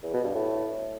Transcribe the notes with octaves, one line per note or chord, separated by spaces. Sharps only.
E2
B2
G2
A2